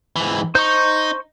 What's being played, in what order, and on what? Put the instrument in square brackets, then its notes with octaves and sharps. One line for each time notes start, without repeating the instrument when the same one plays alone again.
[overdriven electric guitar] G#2 E3
[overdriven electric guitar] D#4 [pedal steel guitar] C5 C#6